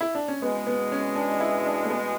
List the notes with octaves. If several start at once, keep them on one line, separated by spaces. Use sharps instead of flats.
E4
D4
C#4
E2 B2 G#3 B3
B3
C#4
D4
E4
D4
A3
B3